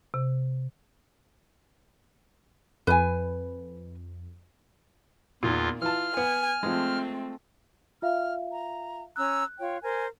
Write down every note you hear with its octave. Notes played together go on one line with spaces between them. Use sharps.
C3
F2 B4 G#5
E2 A#2 D#3 F4
E3 F4 A5 F6
B3 G#5
F3 G#3 A3 C4
F4 E5 F5 F6
A#5
C#4 A#5 E6 F#6
F4 C#5 G5
A#4 C5 G#5